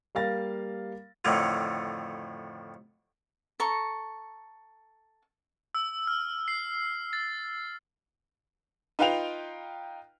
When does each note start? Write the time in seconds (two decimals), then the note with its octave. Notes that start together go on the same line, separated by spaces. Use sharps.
0.15 G3 A#3 F5 A6 A#6
1.25 F2 A2 D3 D#3
3.60 A4 A#5 C#6
5.75 E6
6.07 F6
6.48 C7
7.13 A6
8.99 D#4 F4 B4 F5 G5 F7